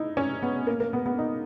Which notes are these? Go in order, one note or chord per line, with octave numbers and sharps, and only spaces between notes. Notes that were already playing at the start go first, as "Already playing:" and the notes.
Already playing: D#4 E4
C#4
B3
A#3
A#3
B3
B3
D#4